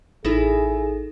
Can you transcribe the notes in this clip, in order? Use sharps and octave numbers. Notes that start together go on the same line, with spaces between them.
A1 D#4 E4 G#4 A4